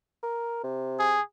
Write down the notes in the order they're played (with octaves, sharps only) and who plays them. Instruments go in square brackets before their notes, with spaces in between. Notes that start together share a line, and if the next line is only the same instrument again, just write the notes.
[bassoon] A#4
C3
[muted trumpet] G#4